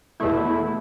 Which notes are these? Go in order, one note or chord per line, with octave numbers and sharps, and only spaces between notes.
E2 B2 A3 E4